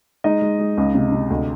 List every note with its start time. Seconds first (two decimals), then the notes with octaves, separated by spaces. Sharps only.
0.24 G#3 D#4 D#5
0.42 G#3
0.60 G#3
0.78 C#2
0.95 C3
1.12 C3
1.30 D2